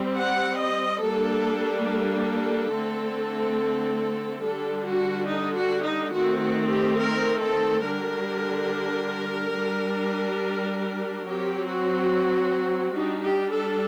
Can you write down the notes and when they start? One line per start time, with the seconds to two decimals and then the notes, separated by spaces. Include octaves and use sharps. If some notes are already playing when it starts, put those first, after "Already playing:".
Already playing: G3 C4
0.17 F#5
0.60 D#5
1.02 G3 A#3 D4 A4
1.88 A4
2.72 D3 A3 C4
4.43 D3 G3 D4 A4
4.86 F#4
5.29 D#4
5.57 F#4
5.85 D#4
6.14 D#3 A3 C4 F#4
6.43 F#4
6.70 G4
6.98 A#4
7.41 A4
7.84 D3 G3 D4 A#4
9.55 G3 D4
11.25 F#3 C4 G4
11.68 F#4
12.95 G3 D4 D#4
13.23 G4
13.52 A4